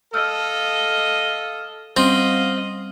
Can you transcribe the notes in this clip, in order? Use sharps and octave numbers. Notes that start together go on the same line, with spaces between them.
A4 D#5 F5 E6 F6 G6
G3 C4 C#4 F#4 D#5 F5